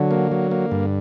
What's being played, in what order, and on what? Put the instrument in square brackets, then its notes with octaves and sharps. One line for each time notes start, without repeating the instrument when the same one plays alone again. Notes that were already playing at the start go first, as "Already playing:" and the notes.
Already playing: [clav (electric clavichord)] D3 [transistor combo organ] F#3
[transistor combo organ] A#3
F#3
A#3
G2